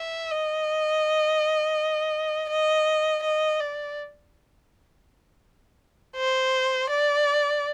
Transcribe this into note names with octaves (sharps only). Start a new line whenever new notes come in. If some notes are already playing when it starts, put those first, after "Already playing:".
Already playing: E5
D#5
D#5
D#5
D5
C5
D5